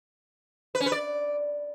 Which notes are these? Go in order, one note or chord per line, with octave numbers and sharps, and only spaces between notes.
B4
C#4
B4
D5